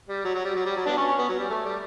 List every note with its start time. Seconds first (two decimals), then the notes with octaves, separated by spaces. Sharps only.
0.09 G3
0.25 F#3
0.35 F#3
0.45 G3
0.56 F#3
0.66 G3
0.76 F#3
0.86 B3 D4
0.97 C#4
1.08 C#4
1.19 B3
1.29 F#3
1.39 G3
1.50 A3
1.65 G3